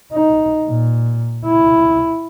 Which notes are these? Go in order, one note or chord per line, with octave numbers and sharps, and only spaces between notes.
D#4
A#2
E4